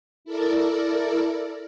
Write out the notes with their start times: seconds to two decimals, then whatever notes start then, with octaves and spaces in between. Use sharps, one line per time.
0.25 E4 A4 A#4 D5